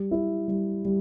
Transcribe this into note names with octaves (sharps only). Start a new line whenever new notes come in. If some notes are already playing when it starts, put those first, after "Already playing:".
Already playing: G3
E4
G3
G3